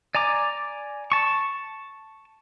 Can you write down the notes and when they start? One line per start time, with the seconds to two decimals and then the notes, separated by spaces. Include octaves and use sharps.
0.15 D5 G#5 A#5 D6
1.12 A5 C#6